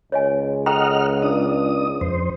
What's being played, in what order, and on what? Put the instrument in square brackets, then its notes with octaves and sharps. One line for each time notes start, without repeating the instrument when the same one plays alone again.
[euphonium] C#2 [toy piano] C#5 D#5 G#5
[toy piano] A4 G5 A#5 [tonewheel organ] D#5 F#5 F6
[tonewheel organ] D4 D#6
F2 C5